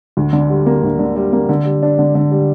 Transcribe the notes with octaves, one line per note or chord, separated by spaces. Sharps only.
D2
D3
G3
A#3
D2
D3
G3
A#3
D3
G3
D4
D3
D3
G3